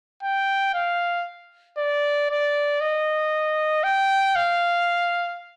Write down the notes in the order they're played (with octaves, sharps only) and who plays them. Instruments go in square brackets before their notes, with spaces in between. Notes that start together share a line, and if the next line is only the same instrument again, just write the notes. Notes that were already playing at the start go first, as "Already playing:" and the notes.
[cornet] G5
F5
D5
D5
D#5
G5
F5